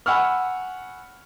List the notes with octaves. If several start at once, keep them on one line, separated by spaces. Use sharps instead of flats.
F#5 G#5 B5 C#6 E6 F6